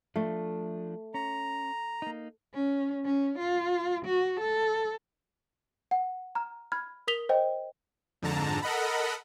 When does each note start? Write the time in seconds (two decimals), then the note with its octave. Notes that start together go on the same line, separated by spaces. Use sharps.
0.16 F3 A3 D4
1.14 C#4 A#5
2.02 A#3 D#4
2.54 C#4
3.05 C#4
3.39 F4
4.05 F#4
4.40 A4
5.91 F#5
6.35 A#5 F6
6.72 B5 F6 G#6
7.07 A#4 D#6 B6 F7 G7
7.29 C5 D#5 G5
8.22 F2 G#2 D3 A5 A#5
8.62 A4 A#4 D#5 F#5 B5